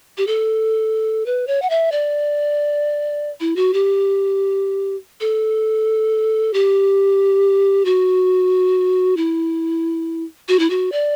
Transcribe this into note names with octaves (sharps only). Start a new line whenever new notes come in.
G4
A4
B4
C#5
F#5
E5
D5
E4
F#4
G4
A4
G4
F#4
E4
F#4
E4
F#4
D5